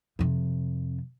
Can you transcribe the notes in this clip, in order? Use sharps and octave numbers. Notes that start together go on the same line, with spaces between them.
F2 C3